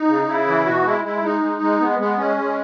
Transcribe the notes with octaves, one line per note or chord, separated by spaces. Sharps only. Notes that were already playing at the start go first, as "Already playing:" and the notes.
Already playing: D#4
C#3
C#3 E4
E3
B2 F#4
G#3 E4
G#3 E4
G#3 D#4
G#3
G#3
G#3 B3
G#3 B3
G#3 C#4
G#3